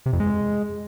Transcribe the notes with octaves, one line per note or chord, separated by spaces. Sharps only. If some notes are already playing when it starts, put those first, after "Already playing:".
C3
F2
G#3